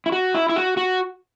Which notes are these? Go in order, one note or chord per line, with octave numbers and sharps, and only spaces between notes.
E4
F#4
E4
E4
F#4
F#4